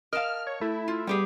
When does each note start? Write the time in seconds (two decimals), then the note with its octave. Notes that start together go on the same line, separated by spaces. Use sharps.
0.13 A#4 D#5 F5 A5 F6
0.47 C#5
0.61 A3 E4
0.88 F4
1.07 G3 B3 G4 G#4